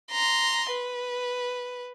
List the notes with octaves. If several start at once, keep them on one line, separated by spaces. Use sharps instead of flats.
A#5 C6
B4